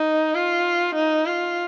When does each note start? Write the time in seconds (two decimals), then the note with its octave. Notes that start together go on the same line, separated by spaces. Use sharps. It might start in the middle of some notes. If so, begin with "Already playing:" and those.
Already playing: D#4
0.35 F4
0.95 D#4
1.26 F4